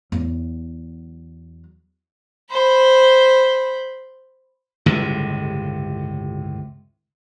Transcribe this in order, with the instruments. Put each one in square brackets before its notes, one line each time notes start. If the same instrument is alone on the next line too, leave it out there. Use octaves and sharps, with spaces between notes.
[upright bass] E2 F#3
[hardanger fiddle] C5 B5
[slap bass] G1 C#2 A2 C3